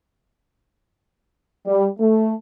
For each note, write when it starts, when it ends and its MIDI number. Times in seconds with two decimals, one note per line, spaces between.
1.66 1.87 55
1.99 2.33 57